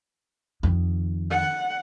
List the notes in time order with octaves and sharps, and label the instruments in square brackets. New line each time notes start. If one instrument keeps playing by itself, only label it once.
[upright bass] F2 D#3
[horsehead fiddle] F#5